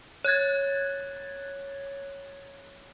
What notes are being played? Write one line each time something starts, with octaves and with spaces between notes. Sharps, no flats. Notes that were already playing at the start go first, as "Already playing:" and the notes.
C#5 F#6 G#6 A6